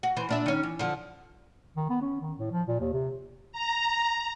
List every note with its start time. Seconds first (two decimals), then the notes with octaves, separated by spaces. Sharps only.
0.03 F#4
0.17 E3 C5
0.29 A#2 D4 E5
0.46 D#3 C#4
0.63 E3
0.79 D3 F3
1.76 D#3
1.89 B3
2.01 C#4
2.20 D#3
2.38 A2
2.52 F3
2.68 A#2
2.80 D#2
2.93 C3
3.52 A#5